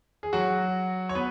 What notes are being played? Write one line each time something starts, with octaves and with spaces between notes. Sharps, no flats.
G#4
F#3 F#4
C#5
B3 B4